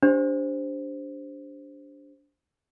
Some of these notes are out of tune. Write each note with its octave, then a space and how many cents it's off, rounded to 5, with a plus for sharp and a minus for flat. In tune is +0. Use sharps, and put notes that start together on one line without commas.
D4 -20 G4 +5 C5 +0